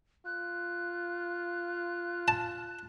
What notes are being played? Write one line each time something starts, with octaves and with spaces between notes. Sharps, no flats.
F4 F#6
A5